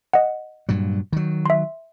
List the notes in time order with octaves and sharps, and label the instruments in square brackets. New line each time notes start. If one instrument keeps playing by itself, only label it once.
[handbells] D#5 F#5
[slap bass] G2 A#2 F#3
D#3 F#3
[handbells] E5 C6